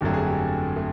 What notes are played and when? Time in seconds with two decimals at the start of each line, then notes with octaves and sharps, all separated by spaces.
0.01 G1 F2 D3 F#3 A3 G4
0.13 G#4
0.27 G4
0.76 A3